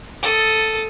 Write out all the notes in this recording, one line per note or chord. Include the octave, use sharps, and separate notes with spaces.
A4 D#6